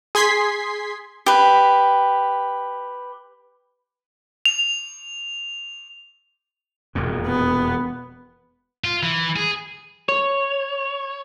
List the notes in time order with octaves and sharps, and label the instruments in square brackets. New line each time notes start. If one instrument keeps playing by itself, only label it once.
[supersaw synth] G#4 C6 G#6 B6 C7
[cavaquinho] G4 B4
[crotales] F7
[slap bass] E1 F2 A#2
[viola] B3
[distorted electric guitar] F4
E3
G#4
[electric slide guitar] C#5